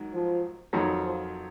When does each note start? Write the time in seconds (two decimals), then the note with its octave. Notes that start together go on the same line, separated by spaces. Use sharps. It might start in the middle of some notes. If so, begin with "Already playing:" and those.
Already playing: G#2 D#3 F#3
0.13 F3
0.73 F2 D#3 F#3
1.02 F3